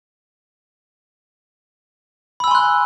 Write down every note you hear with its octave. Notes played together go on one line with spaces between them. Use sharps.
G#5 B5 C6 E6 F#6